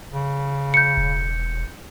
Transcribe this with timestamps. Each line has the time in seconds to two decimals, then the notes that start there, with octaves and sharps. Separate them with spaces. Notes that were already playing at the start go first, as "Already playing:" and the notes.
0.13 C#3
0.74 G6 C#7
0.97 E1